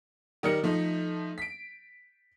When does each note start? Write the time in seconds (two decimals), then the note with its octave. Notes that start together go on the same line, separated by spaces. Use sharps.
0.43 D#3 G3 A#4 C#7
0.64 F3 A3 D#4
1.38 B6 D7